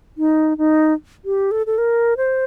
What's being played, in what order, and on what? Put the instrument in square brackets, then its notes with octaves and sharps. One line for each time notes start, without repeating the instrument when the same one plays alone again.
[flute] D#4
D#4
G4
A4
A4
A#4
C5